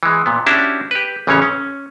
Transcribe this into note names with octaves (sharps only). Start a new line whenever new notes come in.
E3 G#3
A#2 B3
C#4 D4 E4 F#4 G4 A5
G4 B4
A1 C#3 E3 G#3 C#4 C#5
C#4